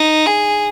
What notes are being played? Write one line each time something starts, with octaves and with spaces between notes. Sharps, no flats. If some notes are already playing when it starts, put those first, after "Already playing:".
Already playing: D#4
G#4